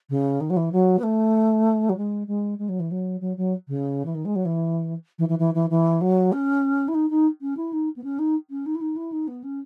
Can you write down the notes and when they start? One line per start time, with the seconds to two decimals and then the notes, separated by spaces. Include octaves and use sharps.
0.09 C#3
0.40 D#3
0.49 F#3
0.56 E3
0.72 F#3
0.98 B3
1.03 A3
1.89 F#3
1.96 G#3
2.27 G#3
2.58 G#3
2.68 F#3
2.79 E3
2.91 F#3
3.20 F#3
3.37 F#3
3.67 C#3
4.05 E3
4.14 D#3
4.25 G#3
4.35 F#3
4.45 E3
5.18 E3
5.28 E3
5.38 E3
5.54 E3
5.70 E3
6.01 F#3
6.32 C#4
6.88 E4
6.94 D#4
7.09 D#4
7.41 C#4
7.56 E4
7.72 D#4
7.96 B3
8.03 C#4
8.18 D#4
8.50 C#4
8.65 D#4
8.74 E4
8.81 D#4
8.96 E4
9.12 D#4
9.27 B3
9.43 C#4